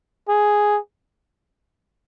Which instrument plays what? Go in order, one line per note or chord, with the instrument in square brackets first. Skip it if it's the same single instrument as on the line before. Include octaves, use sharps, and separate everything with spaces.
[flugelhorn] G#4